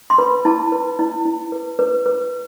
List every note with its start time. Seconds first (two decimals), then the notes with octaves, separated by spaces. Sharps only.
0.10 C6
0.18 B4 B5
0.45 E4 A5
0.72 B4
0.99 E4
1.25 E4
1.52 B4
1.79 B4
2.06 B4